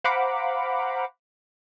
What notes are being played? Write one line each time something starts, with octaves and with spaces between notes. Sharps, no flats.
C5 F5 F#5 A#5 B5 D6